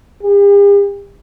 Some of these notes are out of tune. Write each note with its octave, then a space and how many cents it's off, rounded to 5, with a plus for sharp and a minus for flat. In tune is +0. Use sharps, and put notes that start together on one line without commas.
G4 +45